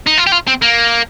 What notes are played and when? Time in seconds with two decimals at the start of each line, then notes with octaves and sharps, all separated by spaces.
0.07 D#4
0.18 F4
0.27 G4
0.32 F4
0.47 C4
0.62 A#3